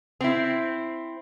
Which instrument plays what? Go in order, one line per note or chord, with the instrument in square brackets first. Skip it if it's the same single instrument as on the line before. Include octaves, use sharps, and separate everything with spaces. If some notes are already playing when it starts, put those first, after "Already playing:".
[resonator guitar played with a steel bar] C4 E4